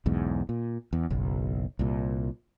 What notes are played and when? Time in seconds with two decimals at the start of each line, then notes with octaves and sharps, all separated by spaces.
0.06 B1 E2 G#2
0.49 A#2
0.93 E2
1.10 F#1 B1
1.79 C2 A#2